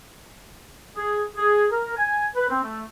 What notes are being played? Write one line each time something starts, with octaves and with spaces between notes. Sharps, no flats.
G#4
G#4
A#4
G#5
B4
C4
A3